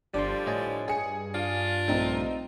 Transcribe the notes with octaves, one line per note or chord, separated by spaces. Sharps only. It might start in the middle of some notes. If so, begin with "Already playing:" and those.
G1 D3 F3 G3 D4 C6 D6
A2 C#5 D#5 G#5
G2 G#4 C#7
D4 F4 F5
A#1 A3 C4 D#4